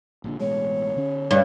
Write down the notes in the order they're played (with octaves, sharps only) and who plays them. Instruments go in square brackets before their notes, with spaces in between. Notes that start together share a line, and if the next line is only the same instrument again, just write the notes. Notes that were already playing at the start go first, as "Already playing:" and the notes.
[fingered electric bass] A#1 A#2 D3
[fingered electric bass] A1 B2 G#3 [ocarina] C#5
[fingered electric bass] D3 C#4
[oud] G2 [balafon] C#5